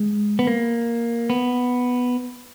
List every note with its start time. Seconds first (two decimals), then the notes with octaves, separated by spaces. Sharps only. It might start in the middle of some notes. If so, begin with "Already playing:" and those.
Already playing: G#3
0.39 B3
0.47 A#3
1.30 B3